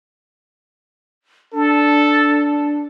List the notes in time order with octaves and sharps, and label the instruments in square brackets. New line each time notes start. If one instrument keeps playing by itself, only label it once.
[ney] D4 [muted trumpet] A4